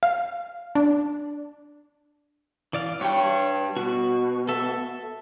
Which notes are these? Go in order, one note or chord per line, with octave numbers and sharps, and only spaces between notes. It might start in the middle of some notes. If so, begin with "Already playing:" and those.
F5
D4
E3 D5 F5
G2 C#5 G5
B2 F#4
A4 E5